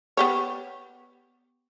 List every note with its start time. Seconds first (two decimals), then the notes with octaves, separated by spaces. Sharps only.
0.17 B3 G4 C#5